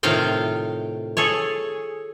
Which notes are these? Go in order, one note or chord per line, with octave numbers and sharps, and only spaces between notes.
A2 C3 D#3 F4 F5 G5
G#4 A4 C#5